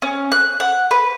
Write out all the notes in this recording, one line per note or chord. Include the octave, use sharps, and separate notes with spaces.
C#4
F#6
F#5
B4